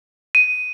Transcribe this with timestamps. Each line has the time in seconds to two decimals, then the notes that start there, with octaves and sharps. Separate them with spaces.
0.35 D#7